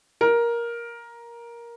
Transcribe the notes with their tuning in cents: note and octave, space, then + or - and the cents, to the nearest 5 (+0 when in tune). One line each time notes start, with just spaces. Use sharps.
A#4 +10